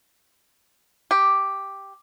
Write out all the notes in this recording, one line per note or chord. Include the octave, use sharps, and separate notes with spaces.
G4